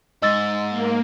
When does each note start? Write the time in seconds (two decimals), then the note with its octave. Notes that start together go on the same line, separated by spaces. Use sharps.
0.22 G#2 D#5 E6 A6
0.70 A#3